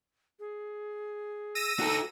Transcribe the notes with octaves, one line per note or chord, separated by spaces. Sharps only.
G#4
E6 A#6 D#7
D#4 F#4 A4